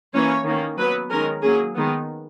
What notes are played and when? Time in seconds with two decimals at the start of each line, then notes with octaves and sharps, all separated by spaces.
0.14 E3 A#3 C#4 C#5
0.46 D#3 A#3 C#4
0.78 F#3 B3 B4
1.10 D#3 G#3 C#4 A#4
1.42 F#3 A#3 C#4 G#4
1.75 D#3 G#3 B3